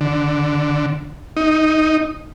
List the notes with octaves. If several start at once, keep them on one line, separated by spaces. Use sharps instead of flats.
D3
D#4